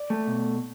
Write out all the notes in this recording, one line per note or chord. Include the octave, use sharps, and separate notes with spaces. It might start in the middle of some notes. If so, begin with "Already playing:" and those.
Already playing: D5
A3
B2